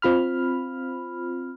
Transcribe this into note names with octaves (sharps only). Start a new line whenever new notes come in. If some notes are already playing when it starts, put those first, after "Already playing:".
C4 F4 B5 F6